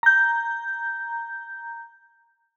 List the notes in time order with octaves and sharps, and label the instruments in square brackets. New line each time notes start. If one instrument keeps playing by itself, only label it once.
[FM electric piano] A#5 G6